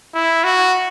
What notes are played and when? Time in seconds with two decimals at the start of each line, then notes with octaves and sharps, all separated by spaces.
0.14 E4
0.44 F#4